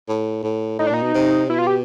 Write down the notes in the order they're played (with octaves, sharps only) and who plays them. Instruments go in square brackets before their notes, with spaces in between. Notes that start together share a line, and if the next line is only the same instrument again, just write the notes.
[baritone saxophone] A2
A2
[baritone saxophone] A2 [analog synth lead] D#4
[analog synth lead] D4
[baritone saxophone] A#2 [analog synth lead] D#4
[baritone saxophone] B2
C3
[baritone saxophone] B2 [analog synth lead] E4
[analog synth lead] F4
G4